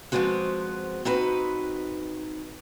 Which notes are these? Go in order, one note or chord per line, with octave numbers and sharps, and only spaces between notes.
F3 F#3 G#3 B3 C4 F#4
C4 D#4 F#4 B4